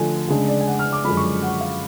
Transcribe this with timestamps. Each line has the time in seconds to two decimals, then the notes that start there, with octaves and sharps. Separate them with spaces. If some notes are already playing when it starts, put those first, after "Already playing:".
Already playing: D3 F3 A3 G#5
0.28 C#3 G#3 D4
0.48 D5
0.61 G#5
0.67 F#5
0.79 F6
0.93 D6
1.04 F#2 D3 F3 G#3 B5
1.17 C#6
1.42 F#5
1.61 F5